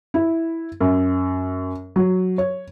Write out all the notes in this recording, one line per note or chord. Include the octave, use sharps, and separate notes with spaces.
E4
F#2
F#3
C#5